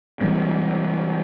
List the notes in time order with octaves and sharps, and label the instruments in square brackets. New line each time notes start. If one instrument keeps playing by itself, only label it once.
[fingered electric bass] E3 G3 G#3 C4